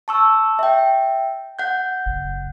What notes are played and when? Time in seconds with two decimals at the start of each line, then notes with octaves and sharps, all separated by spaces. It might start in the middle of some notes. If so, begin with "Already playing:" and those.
0.08 A5 C#6 E6
0.59 E5 G5
1.59 F#5 G6
2.06 F#1